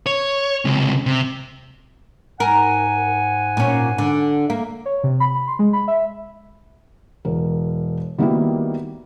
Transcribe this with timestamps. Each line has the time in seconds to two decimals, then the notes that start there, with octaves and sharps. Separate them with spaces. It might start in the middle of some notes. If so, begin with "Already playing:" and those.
0.06 C#5
0.65 C#2 C3
1.06 C3
2.40 G#2 A#4 F#5 G#5
3.57 A#2 C#4
3.98 D3
4.50 A#3
4.86 C#5
5.04 C3
5.20 B5
5.48 C6
5.59 G#3
5.73 B5
5.88 E5
7.25 E1 A#4
8.18 D#3 G3 A#3 B3 E4 F#4